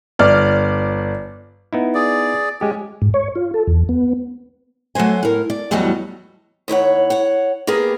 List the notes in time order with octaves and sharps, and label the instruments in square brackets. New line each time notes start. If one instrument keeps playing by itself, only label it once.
[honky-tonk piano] G1 D5 F6
[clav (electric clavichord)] B3 D#4 E4
[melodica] G#4 D5
[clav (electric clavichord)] G#3 G4 [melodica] C#4
[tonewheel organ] G#2
C#5
F4
A4
E2
B3
[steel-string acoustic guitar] F#3 A3 F#4 C5 G#5
A2 A#4
D5
E2 A2 F#3 G3 F#4 D#5
D#2 E4 C#5 F#5
C#5 F#5
A#3 B3 G4 G#4 A#4